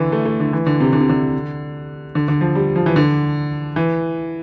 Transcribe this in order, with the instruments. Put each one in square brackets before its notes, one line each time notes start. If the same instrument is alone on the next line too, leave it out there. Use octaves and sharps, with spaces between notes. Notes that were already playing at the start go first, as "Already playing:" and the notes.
Already playing: [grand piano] D3 E3
A3
A3
D3
E3
D3
C3
D3
C3
D3
D3
D3
F3
G3
F3
E3
D3
E3